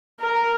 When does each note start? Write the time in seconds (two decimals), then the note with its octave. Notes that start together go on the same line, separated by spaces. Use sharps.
0.20 A#4